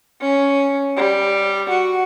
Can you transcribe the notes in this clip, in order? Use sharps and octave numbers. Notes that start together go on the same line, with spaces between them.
C#4
G3
F#4